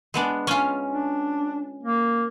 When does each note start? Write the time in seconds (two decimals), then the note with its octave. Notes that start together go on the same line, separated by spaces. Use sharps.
0.14 G#3 B3 D4
0.47 C#4 F4
0.90 D4
1.83 A#3